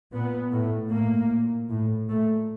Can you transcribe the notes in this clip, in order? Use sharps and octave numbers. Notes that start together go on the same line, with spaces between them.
A#2 B3
A2
A2 A#3
A#2
A2
A#2 A3